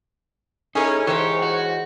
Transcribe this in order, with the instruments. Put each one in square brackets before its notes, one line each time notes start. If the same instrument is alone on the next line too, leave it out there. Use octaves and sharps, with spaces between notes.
[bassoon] A2 [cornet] C#4 [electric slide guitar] D#4 [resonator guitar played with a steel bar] G#4 A#4
[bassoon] G#2 [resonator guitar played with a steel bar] E3 A#4 C5 [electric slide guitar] G4 [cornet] C#5
[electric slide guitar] F#4